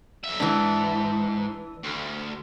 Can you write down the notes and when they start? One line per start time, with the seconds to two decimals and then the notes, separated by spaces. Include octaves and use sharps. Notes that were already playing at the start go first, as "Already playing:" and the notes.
0.24 B1 E5
0.40 G#2 E3 D4
1.83 D2